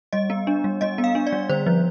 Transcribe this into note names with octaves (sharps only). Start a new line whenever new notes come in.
G3 D#5
B3
D4
G3
G3 D#5
B3
F5
D4
D5
G3
D3 C5
F3